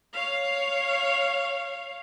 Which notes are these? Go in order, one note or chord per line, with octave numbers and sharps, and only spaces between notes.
C#5 F5